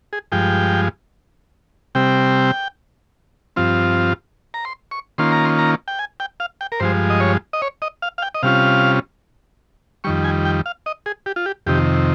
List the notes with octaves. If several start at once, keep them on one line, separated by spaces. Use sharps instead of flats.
G#4
G2 F3 G#3 G5
C3 G3 C4 G5
G2 F3 C4 F4
A#5
C6
C#6
D#3 A#3 C#4 F4 C6
A#5
C6
A#5
G5
G#5
G5
F5
G5
A#4
G2 F3 G#3 C5
D#5
C#5
D#5
C#5
D#5
F5
F5
G5
D#5
C3 G3 C#4 F4 F5
F2 D#3 G3 C#6
G#5
G5
F5
D#5
G#4
G4
F4
G4
F2 C3 D#3 G4